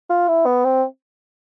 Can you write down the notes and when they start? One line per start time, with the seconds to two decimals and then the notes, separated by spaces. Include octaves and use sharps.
0.10 F4
0.29 E4
0.46 B3
0.65 C4